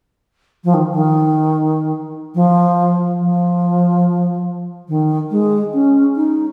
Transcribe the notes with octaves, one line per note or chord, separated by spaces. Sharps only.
F3
D#3
D#3
F3
F3
D#3
G#3
C#4
D#4